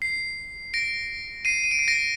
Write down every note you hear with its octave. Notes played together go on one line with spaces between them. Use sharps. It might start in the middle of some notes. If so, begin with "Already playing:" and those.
C7
A#6 D7
C7 D#7
D#7
D7
C7
A#6 D7